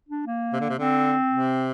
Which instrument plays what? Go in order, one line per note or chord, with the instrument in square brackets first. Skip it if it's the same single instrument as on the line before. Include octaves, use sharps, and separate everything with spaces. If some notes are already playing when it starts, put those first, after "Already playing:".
[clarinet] D4
A#3
[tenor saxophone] C3
D3
C3
[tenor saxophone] D3 [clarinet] C4
[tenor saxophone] C3